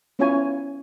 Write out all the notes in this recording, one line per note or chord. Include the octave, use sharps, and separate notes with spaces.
B3 C#4 E4 F4 C#5 G#5